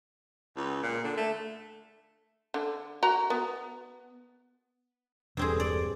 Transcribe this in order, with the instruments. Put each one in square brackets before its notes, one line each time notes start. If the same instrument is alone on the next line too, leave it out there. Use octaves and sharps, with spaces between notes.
[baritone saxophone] C#2
A#2
D3
A3
[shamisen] D3
F#4 A#5
B3
[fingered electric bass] E1 [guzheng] G2 C4 G#4
[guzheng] D5